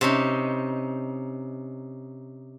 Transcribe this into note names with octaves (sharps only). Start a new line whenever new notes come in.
C3 C#4 D#4